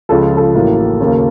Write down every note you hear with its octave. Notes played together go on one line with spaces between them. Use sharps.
C#2 C#3 F3 A4
A4
A1 A2 F#3 A#3
D#2 C#3 F#3 A#3